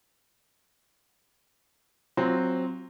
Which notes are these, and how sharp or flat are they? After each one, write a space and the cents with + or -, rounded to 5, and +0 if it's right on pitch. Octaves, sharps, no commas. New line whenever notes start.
F#3 +0 C4 +0 F4 +0